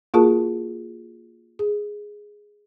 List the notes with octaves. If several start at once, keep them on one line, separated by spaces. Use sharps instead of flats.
A#3 F4 F#4 G#4 A#4 A5
G#4